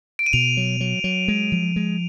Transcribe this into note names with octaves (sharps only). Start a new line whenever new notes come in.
D7
D#7
B2 F7
F#3
F#3
F#3
G#3
F3
G#3